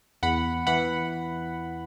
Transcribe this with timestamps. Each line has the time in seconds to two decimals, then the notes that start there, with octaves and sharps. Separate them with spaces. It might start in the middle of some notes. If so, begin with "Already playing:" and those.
0.23 E2 F#5 B5
0.67 E3 F#5 B5